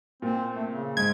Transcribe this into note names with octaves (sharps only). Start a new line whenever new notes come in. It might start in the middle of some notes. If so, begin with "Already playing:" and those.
A#2 C4
A3
C#3
G#2 G#6